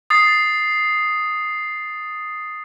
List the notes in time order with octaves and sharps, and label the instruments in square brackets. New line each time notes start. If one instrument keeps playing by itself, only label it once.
[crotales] D#6 A6 C7